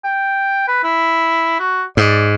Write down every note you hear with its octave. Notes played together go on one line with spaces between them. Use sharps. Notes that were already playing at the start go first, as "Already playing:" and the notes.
G5
B4
E4
F#4
G#2 D5